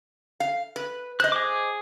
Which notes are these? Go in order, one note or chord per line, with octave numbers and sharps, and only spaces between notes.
F5
B4
C5 D#5 F#6
G#4 D6